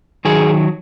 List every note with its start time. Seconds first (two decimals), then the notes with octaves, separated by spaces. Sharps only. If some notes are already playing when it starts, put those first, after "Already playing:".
0.25 D#3 F#3 G#4